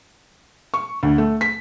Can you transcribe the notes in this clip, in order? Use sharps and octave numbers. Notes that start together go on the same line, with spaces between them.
C#6
D2
A3
B6